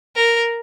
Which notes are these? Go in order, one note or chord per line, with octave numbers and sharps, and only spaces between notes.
A#4